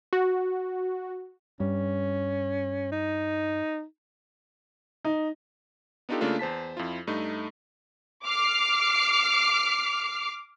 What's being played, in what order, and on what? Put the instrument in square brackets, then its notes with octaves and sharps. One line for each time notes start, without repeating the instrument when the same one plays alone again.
[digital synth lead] F#4
[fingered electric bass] G2 [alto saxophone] C#4
[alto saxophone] D#4
[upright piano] D#4
[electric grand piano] B3 D4 D#4 F4 G4 A4
C#3 A3 A#3 D4 F4 A4
E2 C5 A5 B6
F2 E4 F4
G2 A3 D#4
[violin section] D6 F6 C7